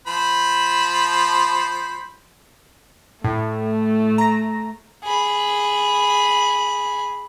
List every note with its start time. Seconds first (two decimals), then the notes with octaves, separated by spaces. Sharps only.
0.07 F3 C5 B5
3.24 A2 A3
4.18 A#5 A#6
5.04 G#4 B5